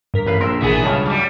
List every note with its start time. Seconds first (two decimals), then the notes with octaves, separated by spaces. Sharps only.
0.14 G2 A#4 B6
0.26 A1 B4 F5
0.41 A#1 A#4 C6 E6
0.61 A1 B2 E3 B3 G#4 B6
0.84 C#2 G2 C#3 A5 F6
1.05 F#3 G3